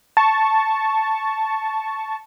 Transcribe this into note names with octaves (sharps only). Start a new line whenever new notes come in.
A5 C#6